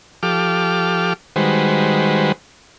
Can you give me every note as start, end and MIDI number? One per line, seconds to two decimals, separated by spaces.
0.23 1.13 53
0.23 1.13 67
0.23 1.13 69
0.23 1.13 86
0.23 1.13 89
1.36 2.32 51
1.36 2.32 55
1.36 2.32 56
1.36 2.32 66
1.36 2.32 71
1.36 2.32 72